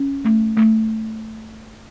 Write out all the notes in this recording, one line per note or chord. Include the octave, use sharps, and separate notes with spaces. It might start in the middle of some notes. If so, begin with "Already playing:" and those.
Already playing: C#4
A3
A3